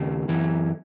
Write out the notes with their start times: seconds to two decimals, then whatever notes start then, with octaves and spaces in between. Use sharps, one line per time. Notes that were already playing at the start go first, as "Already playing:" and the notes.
Already playing: D#2 C#3
0.28 F#2 E3